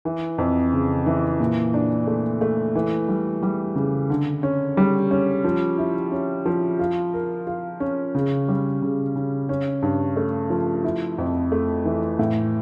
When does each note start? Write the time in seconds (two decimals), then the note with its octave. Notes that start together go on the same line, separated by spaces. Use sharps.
0.05 E3
0.38 F2
0.73 C#3
1.06 E3
1.40 A#2
1.74 D4
2.07 A3
2.41 A3
2.75 E3
3.08 G3
3.43 G3
3.75 C#3
4.10 D3
4.43 C#4
4.77 G3
5.11 C#4
5.44 F3
5.78 E4
6.12 C#4
6.46 F3
6.79 F4
7.14 A#4
7.47 F4
7.80 C#4
8.15 C#3
8.48 G3
8.82 C#3
9.16 C#3
9.49 C#4
9.82 G2
10.16 A3
10.50 F3
10.84 E4
11.18 F2
11.52 A3
11.85 E3
12.19 A2